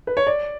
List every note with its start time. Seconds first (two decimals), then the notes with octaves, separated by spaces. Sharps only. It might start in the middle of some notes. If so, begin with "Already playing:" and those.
0.07 B4
0.17 C#5
0.27 D5